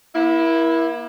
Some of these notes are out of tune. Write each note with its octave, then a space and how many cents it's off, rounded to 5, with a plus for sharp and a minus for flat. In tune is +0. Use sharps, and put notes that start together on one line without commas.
A#3 +40 E4 +0